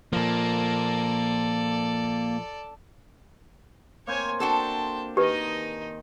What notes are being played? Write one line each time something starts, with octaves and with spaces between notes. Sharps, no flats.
A#2 F3 A#3 A4 D5
A#3 C4 C5 C#5 G#5
D4 F#4 A4 G5 A5
D#3 D#4 G4 B4 D#5 G#5